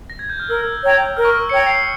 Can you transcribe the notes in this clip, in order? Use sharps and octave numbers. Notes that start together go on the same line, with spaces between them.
A#6
G#6
G6
F6
A#4 E6
C#5 G5 A#5
A#4 F6
C#6
E6
C#5 G5 A#5 C#7
C7